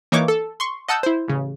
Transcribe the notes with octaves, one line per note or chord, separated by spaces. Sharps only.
E3 A#3 D#4 C#5 C#6 D6
A4
C6 C#6
D#5 F#5 A5 E6 G6
E4 C5
A1 C#3